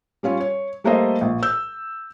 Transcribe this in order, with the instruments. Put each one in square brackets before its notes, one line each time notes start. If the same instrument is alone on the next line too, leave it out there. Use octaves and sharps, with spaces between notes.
[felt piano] G3 C#4 F4 C#5
C#5
G3 A3 A#3 A4 C5 D#5
A#1
E6 G6